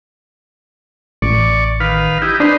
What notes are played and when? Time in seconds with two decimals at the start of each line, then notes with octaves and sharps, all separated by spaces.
1.22 A1 D5 C#6
1.80 D#3 B4 F5
2.22 D#4 E4 G4
2.40 D4 D#4 B4 C5